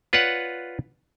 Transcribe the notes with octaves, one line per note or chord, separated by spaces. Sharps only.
F4 B4 C#5 D5 F#5